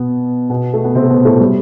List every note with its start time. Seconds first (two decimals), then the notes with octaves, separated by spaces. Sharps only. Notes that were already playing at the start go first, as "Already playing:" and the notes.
Already playing: B2 B3
0.50 B2 B3
0.73 A3
0.84 B3
0.95 C3 C4
1.02 A3
1.10 B2 B3
1.25 A2 A3
1.40 G3